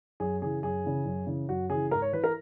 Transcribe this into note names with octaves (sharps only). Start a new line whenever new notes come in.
F#2 G#4
C#3 E3 G#4
F#2 G#4
C#3 E3
F#2
C#3 E3
F#2 F#4
C#3 E3 G#4
G#2 A#4
C#5
E3 B4
A#4